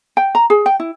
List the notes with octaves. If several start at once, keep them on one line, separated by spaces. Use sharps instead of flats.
G5
A#5
G#4
G5
E4